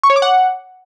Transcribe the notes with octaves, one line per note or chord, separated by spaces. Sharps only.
C#6
C#5
D6
F#5